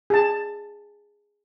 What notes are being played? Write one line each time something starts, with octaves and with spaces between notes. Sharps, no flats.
G#4 A5